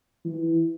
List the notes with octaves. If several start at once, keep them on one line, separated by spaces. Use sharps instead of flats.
E3